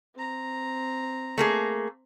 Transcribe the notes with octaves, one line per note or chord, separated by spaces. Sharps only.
C4 A#5
A3 A#3 G#4